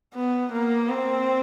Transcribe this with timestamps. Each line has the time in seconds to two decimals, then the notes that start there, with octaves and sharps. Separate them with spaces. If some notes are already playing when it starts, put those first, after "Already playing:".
0.14 B3
0.53 A#3
0.89 C4